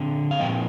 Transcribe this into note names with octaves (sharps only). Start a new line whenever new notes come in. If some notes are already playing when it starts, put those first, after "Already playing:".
Already playing: D3 C4
F5
A#2 F3 C4 D#5 G5